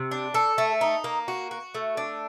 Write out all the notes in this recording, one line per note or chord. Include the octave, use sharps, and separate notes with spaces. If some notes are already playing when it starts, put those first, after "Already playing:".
Already playing: C3
D4
A4
A3
D#4
A#3
F#4
F#4
A3
D4